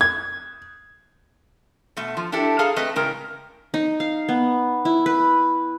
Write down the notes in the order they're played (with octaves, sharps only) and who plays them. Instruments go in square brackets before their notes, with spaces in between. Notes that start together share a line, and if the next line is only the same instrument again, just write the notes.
[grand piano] G#6
[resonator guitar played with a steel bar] B2 A3
F3
D4 E4 G4 A4
G#4 A4 F5 A5 A#5
A3 C4 B4 D#5
A2 C#3 G#3 A#4 G5 A#5
[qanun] D#4
F5
B3
E4
B4